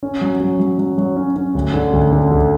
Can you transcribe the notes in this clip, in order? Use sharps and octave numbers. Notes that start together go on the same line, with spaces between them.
C#4
F#3
F#3
F#3
F#3
F#3
C#4
C#4
D2
D3
D2
D3
D2